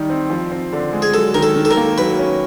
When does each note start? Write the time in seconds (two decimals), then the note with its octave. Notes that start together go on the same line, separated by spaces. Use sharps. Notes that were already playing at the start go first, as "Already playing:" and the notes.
Already playing: D#3 G3 D#4
0.10 C4
0.30 F3
0.52 C4
0.73 D3
0.93 G#3
1.02 G#4
1.14 F#3 A4
1.34 D#3 A#4
1.43 A4
1.56 D#3
1.65 A4
1.71 A#4
1.77 A#3
1.98 F#3 B4
2.19 C#4